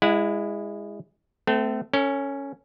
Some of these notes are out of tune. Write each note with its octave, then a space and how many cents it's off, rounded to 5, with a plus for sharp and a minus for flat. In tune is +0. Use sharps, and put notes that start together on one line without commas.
G#3 -20 E4 +10 F#5 -25
A3 +0 C4 -35 A4 +0
C#4 +0 A4 +45